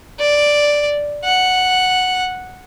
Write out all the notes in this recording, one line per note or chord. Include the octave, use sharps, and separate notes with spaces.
D5
F#5